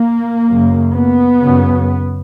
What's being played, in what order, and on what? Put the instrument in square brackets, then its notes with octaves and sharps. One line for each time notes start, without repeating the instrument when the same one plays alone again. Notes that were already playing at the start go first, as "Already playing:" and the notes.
Already playing: [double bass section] A#3
F#2 C#3
B3
F#2 C#3